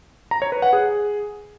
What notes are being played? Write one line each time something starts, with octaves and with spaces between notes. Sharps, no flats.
A#5
C#5
B4
F#5
G#4